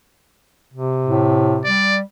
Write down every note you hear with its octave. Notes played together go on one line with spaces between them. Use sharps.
C3
A2
G3 D5